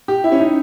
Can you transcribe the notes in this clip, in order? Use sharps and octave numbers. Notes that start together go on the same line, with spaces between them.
G4
E4
C#4
D#4